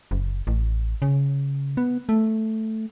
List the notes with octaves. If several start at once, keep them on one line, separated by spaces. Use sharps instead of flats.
F#1
A1
C#3
B3
A3